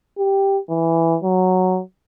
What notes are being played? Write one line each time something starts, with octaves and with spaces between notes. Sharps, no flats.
G4
E3
F#3